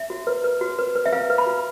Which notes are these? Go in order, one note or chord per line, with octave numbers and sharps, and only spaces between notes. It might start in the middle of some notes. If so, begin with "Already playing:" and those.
Already playing: E5
F#4
B4
B4
F#4
B4
B4
E5
B4 F5
B4
B5
F#4